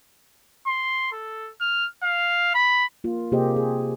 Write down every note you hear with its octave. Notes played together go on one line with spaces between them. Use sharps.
C6
A4
F6
F5
B5
A#3 F4
C3 A#3 G4 G#4 C5 D#5
G#4